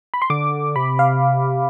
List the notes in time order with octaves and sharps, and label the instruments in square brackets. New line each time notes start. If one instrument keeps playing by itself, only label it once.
[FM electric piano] B5
C6
[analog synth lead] D3 [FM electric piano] D6
[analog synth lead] C3 [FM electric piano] B5
[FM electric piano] F5